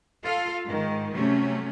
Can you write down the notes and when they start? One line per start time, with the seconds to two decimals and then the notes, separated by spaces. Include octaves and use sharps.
0.23 F4 A4 F5
0.66 G#2 D#3
1.15 C3 F#3 A3 C#4